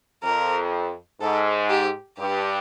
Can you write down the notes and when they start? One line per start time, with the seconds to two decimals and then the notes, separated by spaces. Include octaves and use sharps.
0.24 F2 A#4
1.21 G#2 A4
1.70 G4
2.18 G2 G4